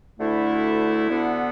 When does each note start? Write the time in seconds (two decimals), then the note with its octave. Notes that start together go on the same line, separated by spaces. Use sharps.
0.18 D2 D3 A3 E4
1.09 D2 D3 B3